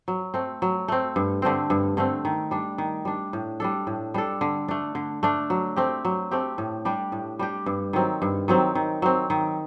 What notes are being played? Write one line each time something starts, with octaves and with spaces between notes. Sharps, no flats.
F#3
A3 C4
F#3
A3 C4
G2
D3 A3 C4
G2
D3 A3 C4
D#3
G3 D4
D#3
G3 D4
A2
G3 D4 A4
A2
G3 D4 A4
D3
A3 D4
D3
A3 D4
F#3
A3 C4 G4
F#3
A3 C4 G4
A2
G3 D4 G4
A2
G3 D4 G4
G2
D#3 F#3 C4
G2
D#3 F#3 C4
D#3
F#3 C4
D#3